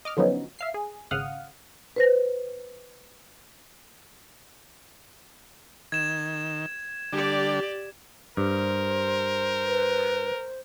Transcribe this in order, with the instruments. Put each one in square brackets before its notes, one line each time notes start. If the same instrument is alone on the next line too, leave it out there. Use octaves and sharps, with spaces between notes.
[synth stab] D#5 D6 F6
D3 F3 F#3 B3 C#4 D#4
E5 F5 C7
G#4
G#1 C#3 F5 F#5 D#6 F6
[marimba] B4 C5 A#6
[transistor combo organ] D#3 [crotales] G#6 E7
[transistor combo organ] D3 G3 D4 [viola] G4 D5
[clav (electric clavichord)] G2 [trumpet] A#4 [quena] C5
[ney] B4